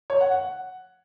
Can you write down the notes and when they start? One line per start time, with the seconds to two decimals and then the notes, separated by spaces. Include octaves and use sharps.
0.10 C#5
0.21 F#5
0.31 F#5